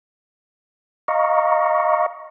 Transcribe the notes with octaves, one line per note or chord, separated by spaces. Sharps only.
D#5 F5 A#5 C#6